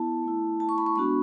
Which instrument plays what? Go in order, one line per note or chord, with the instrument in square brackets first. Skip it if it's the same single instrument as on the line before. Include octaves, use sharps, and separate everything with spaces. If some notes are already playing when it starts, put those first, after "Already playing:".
Already playing: [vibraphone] B3 E4 A5
A3 E4
A5
C#6
B5
C#6
G#3 B3 D4 F#4 B5